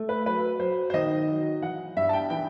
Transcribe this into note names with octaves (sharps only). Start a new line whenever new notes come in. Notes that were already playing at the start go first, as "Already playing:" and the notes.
Already playing: A3
B4
F#3 B4
F#3 C5
C5
D#3 D#5
F#3
E3 F#5
G2 E5
A5
G5
E3 G5